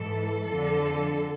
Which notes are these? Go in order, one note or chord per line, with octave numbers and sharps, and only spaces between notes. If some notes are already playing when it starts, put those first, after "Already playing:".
Already playing: G#2 E3 A4
F2 D3